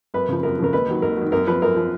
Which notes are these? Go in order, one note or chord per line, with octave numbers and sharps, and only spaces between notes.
F#2 B4
C#3 F3
F#2 A#4
C#3 F3 A#4
D#2 B4
D#3 F#3
D#2 A#4
D#3 F#3
F#2 A#4
F3 B4
F#2 A#4
F3